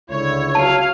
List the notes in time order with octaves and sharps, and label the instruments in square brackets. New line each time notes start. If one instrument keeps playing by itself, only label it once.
[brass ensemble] C#2 D3 E4 [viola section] C#5
[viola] F#3 F5 [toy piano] A5